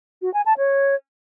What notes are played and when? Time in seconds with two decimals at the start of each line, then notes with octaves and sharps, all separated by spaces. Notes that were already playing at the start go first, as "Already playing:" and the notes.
0.22 F#4
0.34 G#5
0.46 A5
0.58 C#5